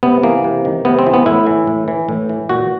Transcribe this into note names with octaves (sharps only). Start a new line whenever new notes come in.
C3 B3
E3 A#3
C3
D#3
C3 B3
C4
E3
B3
A2 E4
E3
A2
E3
A2
E3
A#2 F#4